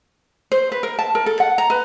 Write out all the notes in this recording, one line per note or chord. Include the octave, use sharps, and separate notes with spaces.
C5
B4
A#4
A5
A#4
A4
F#5
A#5
B4